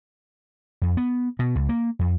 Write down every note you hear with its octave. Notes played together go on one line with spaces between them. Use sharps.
F2
B3
B2
C#2
A#3
F2